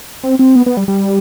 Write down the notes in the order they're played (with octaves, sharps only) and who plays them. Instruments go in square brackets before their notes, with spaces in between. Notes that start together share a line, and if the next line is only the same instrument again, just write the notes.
[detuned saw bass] C4
C4
B3
B3
G3
G3